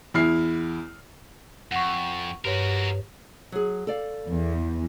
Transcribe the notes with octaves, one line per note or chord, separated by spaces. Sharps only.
E2 E4 F6 C7
F2 F#5 C#6
G2 F#4 G4 A#4 B4 C#5
F#3 G#4
A4 D5 F5
E2